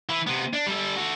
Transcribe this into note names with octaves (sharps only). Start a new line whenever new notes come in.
E3
C3 B3
D4
G3 A4
F#4 A4